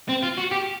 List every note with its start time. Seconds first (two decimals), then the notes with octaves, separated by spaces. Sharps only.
0.09 C4
0.23 F4
0.37 F#4
0.51 G4